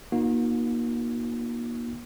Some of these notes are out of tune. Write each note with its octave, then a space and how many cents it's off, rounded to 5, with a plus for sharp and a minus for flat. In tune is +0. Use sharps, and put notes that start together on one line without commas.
A#3 +35 D#4 +0 F#4 -45